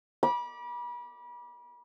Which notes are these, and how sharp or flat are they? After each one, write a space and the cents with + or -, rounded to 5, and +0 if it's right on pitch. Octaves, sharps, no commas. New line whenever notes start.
B5 -35 D6 +0